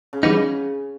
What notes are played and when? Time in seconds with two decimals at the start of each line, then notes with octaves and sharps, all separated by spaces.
0.13 C#3
0.23 E3 G3 B3 D#4
0.33 C#3